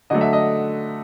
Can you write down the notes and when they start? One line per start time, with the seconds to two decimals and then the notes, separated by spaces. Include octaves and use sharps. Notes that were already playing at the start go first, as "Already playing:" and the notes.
0.10 D3 F#3 A3 D#5
0.21 E5
0.33 D#5